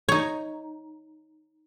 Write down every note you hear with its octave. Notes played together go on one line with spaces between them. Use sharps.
D#4 C#5